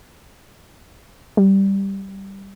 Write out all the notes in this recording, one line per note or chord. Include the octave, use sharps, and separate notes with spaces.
G3